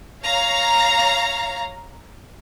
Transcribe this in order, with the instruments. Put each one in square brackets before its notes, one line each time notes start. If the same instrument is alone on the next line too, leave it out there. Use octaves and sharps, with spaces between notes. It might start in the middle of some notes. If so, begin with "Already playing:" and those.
[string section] C#5 F5 A#5